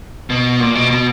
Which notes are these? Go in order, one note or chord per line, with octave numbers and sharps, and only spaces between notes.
B2
A#2
B2
B2